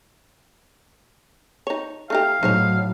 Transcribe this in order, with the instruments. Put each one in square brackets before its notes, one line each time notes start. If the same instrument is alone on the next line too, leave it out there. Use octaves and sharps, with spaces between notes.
[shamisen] D#4 C#5
[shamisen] A3 D#4 G4 [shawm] F5
[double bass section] A2 F#3 [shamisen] D#4 C5 C#5